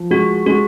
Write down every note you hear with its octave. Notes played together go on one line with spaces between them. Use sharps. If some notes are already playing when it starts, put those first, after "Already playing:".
Already playing: F3
G#3 F#4
G#3 F#4